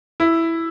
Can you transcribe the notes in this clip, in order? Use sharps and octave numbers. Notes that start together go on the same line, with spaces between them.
E4